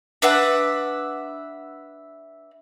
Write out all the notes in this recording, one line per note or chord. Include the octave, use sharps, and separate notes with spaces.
D4 B4 E5 F#5